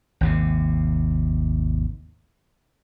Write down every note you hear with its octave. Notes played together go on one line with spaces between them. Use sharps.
G#1 D#2 C3